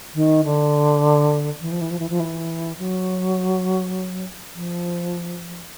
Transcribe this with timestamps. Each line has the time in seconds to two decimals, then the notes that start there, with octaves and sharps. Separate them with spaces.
0.15 D#3
0.45 D3
1.61 E3
1.72 F3
1.81 E3
1.91 F3
1.99 E3
2.10 F3
2.20 E3
2.78 F#3
4.55 F3